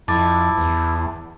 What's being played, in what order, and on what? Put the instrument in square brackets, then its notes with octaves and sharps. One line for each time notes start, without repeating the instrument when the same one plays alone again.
[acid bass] F2 [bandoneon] E4 [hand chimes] A5 D6 A6
[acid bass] E2